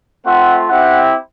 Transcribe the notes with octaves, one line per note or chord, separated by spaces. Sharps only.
A3 C4 F4 E5 F#5
C4 E4 G4 E5 F#5